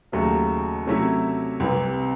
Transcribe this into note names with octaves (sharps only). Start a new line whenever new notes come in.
D#2 C#3 F#3 A3
C3 F#3 A3 C#4 E4
C2 C3 E3